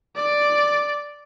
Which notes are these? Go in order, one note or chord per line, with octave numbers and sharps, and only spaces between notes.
D5